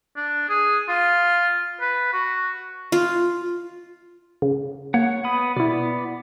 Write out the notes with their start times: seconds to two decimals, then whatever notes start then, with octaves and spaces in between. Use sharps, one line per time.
0.16 D4
0.49 G#4
0.89 F4
1.81 B4
2.13 F#4
2.92 F4
4.42 C#3
4.94 A#3 C#5 F#5
5.24 B3 B5 D#6
5.57 B2 B3 E4 D5